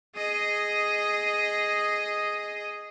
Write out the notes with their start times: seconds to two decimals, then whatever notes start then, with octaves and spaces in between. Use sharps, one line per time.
0.15 G#4 D#5